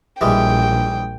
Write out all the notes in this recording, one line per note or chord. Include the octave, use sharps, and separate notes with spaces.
A#1 E3 G3 G#3 G5